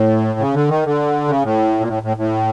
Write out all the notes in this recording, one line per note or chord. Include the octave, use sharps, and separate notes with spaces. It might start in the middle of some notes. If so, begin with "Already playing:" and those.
Already playing: A2
C#3
D3
D#3
D3
C#3
A2
A#2
A2
A2
A2